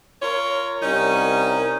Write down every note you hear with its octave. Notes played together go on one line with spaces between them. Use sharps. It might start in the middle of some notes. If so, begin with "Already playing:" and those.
F4 A#4 C#5
C2 G3 C#4 D#4 A#4